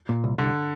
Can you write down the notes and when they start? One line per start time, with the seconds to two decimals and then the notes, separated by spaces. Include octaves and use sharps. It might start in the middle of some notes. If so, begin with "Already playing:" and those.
0.09 A#2
0.24 C2
0.38 C2 D3